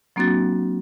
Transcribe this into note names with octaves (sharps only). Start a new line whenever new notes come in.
F#3 A#3 C4 D4 F#4 A6